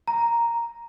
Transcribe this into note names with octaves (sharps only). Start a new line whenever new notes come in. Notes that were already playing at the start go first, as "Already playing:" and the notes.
A#5